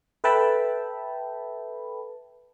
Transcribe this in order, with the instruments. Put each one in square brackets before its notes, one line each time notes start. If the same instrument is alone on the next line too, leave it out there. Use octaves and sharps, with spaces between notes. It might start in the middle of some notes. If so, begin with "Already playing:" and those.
[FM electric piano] A4 B4 E5 G5 A5 B5